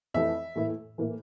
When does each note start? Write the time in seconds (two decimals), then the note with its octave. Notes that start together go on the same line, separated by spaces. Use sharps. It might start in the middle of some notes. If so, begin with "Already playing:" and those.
0.14 F2 E3 A3 E4 E5
0.55 A2 E3 A#3 E4
0.98 A2 E3 A#3 E4